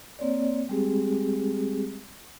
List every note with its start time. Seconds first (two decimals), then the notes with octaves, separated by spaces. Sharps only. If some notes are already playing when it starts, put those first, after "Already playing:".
0.19 A#3 C4 C#5 D5
0.69 G3 G#3 C4 G4 G#4